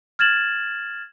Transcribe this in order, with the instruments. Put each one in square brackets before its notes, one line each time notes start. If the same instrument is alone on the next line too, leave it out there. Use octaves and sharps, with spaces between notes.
[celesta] F6 G#6 A6 E7 F#7